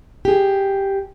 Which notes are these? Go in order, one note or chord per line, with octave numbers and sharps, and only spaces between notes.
G4 G#4